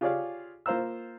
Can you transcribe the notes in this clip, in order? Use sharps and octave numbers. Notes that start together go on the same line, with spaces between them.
F4 G4 G#4 C#5 D5 F5
A#3 F4 C5 F5 A#5 E6